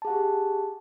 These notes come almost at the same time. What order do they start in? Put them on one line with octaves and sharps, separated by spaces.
A5 G#4 F#5 G4